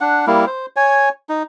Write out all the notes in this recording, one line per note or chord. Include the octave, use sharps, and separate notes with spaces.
D4 F#5
G3 A#3 E4
C5
C#5 G#5
D#4